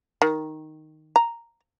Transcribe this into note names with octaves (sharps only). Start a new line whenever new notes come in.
D#3
A#5